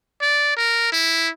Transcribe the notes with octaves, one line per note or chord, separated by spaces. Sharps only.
D5
A#4
E4